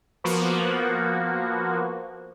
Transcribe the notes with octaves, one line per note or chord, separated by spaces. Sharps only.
F3 A#3 B3 F#4